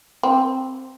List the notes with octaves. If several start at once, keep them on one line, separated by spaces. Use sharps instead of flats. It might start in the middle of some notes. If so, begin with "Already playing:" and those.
C4